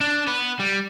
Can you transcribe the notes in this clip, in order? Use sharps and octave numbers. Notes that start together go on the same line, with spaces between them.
D4
B3 B4
G3